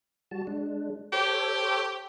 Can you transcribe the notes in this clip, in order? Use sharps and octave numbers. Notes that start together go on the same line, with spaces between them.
G3 F#4 A5
G#3 D4
G4 A4 C5 C#5